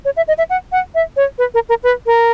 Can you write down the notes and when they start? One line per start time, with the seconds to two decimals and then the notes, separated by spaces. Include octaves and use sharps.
0.05 C#5
0.17 E5
0.28 D#5
0.38 E5
0.50 F#5
0.72 F#5
0.95 E5
1.17 C#5
1.38 B4
1.54 A#4
1.69 A#4
1.83 B4
2.06 A#4